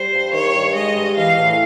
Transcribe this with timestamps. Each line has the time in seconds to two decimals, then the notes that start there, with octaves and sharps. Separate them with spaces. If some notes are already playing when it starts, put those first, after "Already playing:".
Already playing: G3 C5
0.12 G2
0.33 D#3 C#5
0.54 G2
0.75 G#3 D#5
0.95 G2
1.16 E3 F5
1.37 A2